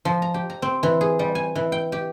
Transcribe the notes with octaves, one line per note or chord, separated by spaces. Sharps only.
F3
A#5
G4
A#5
C4
E3
G#4
G3
G#5
E3
G5
G4